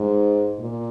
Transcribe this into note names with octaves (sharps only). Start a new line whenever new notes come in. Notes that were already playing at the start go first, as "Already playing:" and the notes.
Already playing: G#2
A#2